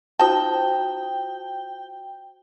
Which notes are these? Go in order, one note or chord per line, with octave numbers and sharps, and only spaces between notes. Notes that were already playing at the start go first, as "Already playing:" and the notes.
D#4 F4 F#4 C5 G5 A5